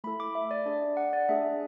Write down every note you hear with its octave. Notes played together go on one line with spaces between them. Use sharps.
A3 E4 A4 B5
D6
E5
D5
D4 G#4 D5
F#5
D5
A3 D4 G#4 E5